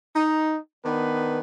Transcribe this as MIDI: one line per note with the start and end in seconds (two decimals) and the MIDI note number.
0.15 0.56 63
0.84 1.40 51
0.84 1.40 59
0.84 1.40 62
0.84 1.40 71